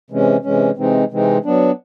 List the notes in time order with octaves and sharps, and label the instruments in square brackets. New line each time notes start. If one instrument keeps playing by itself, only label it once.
[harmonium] C3 E3 G#3 C#4
C3 E3 G#3 C#4
C3 E3 G#3 C4 D#4
C3 E3 G#3 C4 D#4
F#3 B3 D4